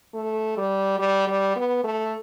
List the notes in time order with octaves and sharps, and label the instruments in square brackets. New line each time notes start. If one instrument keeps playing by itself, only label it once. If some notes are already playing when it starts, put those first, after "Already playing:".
[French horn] A3
G3
G3
G3
B3
A3